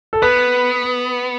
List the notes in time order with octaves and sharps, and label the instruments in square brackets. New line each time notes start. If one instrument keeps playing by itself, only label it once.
[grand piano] A4
[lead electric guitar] B3 [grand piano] B4